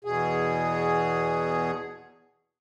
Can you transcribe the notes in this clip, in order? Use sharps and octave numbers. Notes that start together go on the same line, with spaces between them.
E2 B2 G#4